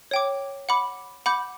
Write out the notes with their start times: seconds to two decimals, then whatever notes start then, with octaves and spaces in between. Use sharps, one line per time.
0.11 C#5 G5 D6
0.69 F#5 B5 D6
1.26 F#5 B5 D6 G6